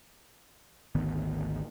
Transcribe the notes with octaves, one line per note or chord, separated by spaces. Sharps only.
G#1 D2 D#3 B3